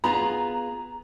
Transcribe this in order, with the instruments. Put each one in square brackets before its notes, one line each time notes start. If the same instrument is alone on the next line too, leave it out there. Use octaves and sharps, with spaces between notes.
[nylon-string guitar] B3 F4 G#4 [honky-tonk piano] A#5